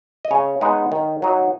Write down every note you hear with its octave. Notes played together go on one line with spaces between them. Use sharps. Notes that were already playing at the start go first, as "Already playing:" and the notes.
D#5
C#3 C#5
G#3 B3 D#4
D#3
F#3 D#4